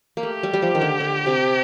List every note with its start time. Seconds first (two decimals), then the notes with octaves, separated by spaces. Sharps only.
0.17 A#3
0.23 A3 G4
0.43 G3
0.53 G3
0.62 F3
0.75 D#3
0.81 D3
1.00 D3
1.26 C3